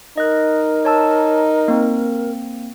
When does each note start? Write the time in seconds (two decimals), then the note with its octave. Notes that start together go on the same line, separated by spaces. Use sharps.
0.17 D#4 A#4 D#5 F#6
0.85 C#5 A5 E6
1.68 A#3 C4